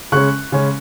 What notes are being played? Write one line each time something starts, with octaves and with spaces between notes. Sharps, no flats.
C#3 G#3 C#4 C#6 F#6
C#3 G#3 C#4